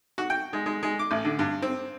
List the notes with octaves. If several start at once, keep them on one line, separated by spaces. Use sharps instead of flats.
F#4
G5
G#3
G#3
G#3
D6
A1
D3
G2
C4